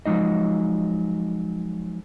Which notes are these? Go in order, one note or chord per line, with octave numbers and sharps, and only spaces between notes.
F3 F#3 G#3 D#4 D#5